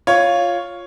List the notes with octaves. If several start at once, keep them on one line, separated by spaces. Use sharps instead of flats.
F4 C#5